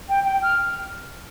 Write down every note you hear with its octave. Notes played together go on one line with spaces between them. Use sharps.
G5
G5
F6